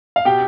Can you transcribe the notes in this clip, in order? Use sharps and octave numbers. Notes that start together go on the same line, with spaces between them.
F5
B2 G4 G5